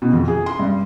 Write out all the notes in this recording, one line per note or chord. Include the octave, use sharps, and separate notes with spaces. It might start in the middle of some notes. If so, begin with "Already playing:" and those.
B2
F2
G#4
C6
G2